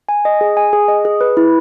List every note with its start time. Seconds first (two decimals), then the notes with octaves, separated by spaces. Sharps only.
0.09 G#5
0.25 D#5
0.41 G#4
0.57 G#5
0.73 G#4
0.88 D#5
1.05 G#4
1.21 B4
1.37 E4